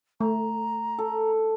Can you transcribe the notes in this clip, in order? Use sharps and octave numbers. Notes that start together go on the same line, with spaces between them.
A3 A#5
A4